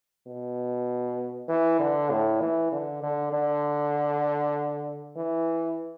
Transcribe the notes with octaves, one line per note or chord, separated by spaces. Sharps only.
B2
E3
D3
A2
E3
D3
D3
D3
E3